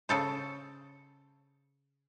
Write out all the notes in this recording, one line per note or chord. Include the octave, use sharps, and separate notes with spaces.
C#3 A4 C5